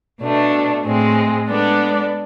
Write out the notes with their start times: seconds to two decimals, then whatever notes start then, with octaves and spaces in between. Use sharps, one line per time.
0.20 B2 A3 D4
0.84 A2 G#3 C4
1.47 G#3 B3 D4 A4 D5